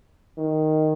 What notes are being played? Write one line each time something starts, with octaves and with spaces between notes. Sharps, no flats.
D#3